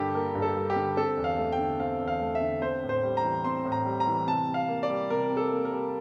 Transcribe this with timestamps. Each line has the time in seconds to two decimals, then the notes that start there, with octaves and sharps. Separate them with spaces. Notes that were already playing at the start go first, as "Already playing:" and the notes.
Already playing: G2 D3 G3 A#3 G4 A4
0.15 A#3 A#4
0.35 G2
0.42 A4
0.56 G3
0.70 G4
0.76 D3
0.97 C4 A4
1.17 E2
1.24 F5
1.38 A3
1.52 G5
1.58 D3
1.80 C4 F5
2.00 E2
2.08 F5
2.21 A3
2.35 E5
2.41 D3
2.62 C4 C5
2.83 A2
2.89 C5
3.03 G3
3.17 A#5
3.24 E3
3.44 C4 C6
3.65 A2
3.72 A#5
3.85 G3
4.00 A#5
4.07 E3
4.27 C3 A5
4.49 C3
4.54 F5
4.68 A#3
4.83 D5
4.89 G3
5.10 C3 A#4
5.30 C3
5.37 A4
5.51 A#3
5.65 A#4
5.72 G3